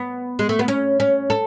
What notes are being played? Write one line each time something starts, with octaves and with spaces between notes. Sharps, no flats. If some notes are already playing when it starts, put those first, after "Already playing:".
Already playing: B3
G#3
A3
B3
C#4
C#4
A4